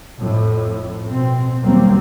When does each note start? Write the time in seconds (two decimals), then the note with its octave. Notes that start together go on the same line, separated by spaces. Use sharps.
0.19 F2 A2
1.07 B2 C4
1.63 D#2 F#3 G3 A#3 C4